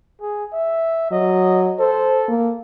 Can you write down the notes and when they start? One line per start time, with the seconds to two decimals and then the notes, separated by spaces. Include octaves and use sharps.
0.21 G#4
0.53 E5
1.12 F#3 D#5
1.79 A4 C5
2.28 A#3